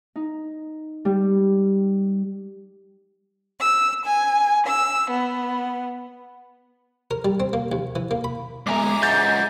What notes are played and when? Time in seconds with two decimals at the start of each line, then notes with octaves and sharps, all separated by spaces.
0.16 D#4
1.05 G3
3.59 E6
4.04 G#5
4.66 E6
5.10 B3
7.11 A#4
7.25 G3
7.40 C4
7.53 A#3
7.72 D#2
7.96 E3
8.11 A#3
8.24 B5
8.67 C#2 G#3 B3 A4 E5 G#5 A#5 D6
9.03 G#4 D#5 F#5 G6 A6